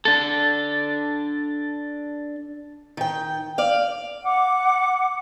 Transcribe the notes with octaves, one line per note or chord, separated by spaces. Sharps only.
D4 A4
D#3 G5
D5 F5
F#5 D6